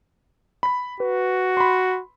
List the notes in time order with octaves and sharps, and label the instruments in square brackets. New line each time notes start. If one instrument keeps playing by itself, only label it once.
[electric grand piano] B5 B6
[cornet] F#4 [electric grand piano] B4
[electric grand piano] B5 C6